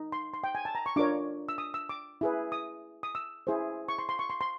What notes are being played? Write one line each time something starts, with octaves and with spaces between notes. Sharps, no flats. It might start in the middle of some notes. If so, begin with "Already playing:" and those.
Already playing: D#4
C6
C6
G5
G#5
A5
A#5
C#6
D4 F4 A#4 C#5 D6
E6
D#6
E6
D6
E4 G#4 B4
D#6
D#6
E6
E4 G#4 C5
C#6
C6
C6
C#6
C6
C6